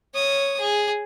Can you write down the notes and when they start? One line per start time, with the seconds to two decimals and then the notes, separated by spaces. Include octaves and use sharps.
0.14 C#5 D#6
0.60 G#4